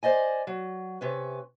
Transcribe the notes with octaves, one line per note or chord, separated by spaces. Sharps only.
C5 D5 D#5 G#5
F#3
C3 C#4 B4